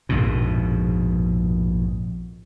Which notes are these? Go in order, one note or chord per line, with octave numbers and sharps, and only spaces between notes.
A#1 F2 G#2 B2